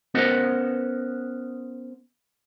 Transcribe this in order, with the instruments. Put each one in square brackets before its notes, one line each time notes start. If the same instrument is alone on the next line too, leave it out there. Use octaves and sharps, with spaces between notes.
[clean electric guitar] B3 C#4 A#4 C5 D#5 F#5